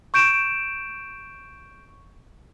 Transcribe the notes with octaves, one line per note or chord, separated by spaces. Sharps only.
C#6 G6 D7 E7